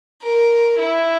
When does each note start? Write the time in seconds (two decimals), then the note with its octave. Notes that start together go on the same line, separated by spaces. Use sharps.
0.22 A#4
0.79 E4